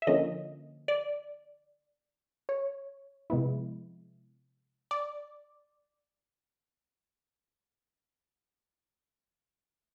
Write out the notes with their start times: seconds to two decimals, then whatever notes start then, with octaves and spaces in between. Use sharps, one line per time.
0.02 E5
0.07 D3 F3 A#3 C#4 D#5
0.88 D5
2.49 C#5
3.30 C3 F3 G#3 B3 E4
4.91 D5